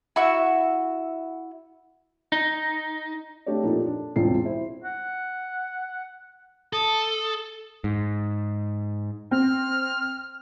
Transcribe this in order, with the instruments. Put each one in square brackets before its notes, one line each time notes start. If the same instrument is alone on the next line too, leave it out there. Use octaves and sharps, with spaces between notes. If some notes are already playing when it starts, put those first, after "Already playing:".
[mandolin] E4 F#4 E5
[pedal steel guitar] D#4
[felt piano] A3 D4 G4 A4 C#5 D5
A#2 F3 D#4 G4 A4
D4
E1 C2 C4 D4 F4 C7
E4 C5
[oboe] F#5
[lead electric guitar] A4 [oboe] D#6
[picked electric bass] G#2
[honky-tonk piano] C4 [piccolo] F6